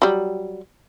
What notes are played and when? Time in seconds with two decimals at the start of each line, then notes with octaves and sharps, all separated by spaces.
0.02 F#3 G3